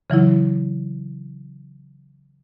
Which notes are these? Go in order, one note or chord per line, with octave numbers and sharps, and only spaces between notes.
C#3 E3 F#3 E4